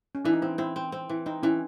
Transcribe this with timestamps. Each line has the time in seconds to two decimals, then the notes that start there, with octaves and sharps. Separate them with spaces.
0.15 C#4
0.25 E3 D4
0.33 D#4
0.42 C4 E4
0.58 C4 E4
0.76 C4
0.92 C4
1.09 E3
1.26 C4 D#4
1.43 E3 C#4